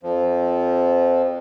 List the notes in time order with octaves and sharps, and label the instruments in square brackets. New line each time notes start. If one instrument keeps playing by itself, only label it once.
[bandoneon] F2 F3